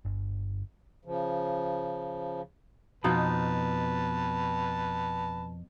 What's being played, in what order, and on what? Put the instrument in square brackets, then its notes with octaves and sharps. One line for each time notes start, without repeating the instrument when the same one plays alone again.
[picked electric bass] G1
[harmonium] C#3 F3
[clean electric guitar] F2 [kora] B2 D#4 F4 [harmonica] B4 A5